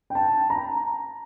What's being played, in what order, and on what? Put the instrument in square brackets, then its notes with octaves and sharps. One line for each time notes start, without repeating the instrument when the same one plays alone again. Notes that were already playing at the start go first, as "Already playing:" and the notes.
[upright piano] G5
A5
A#5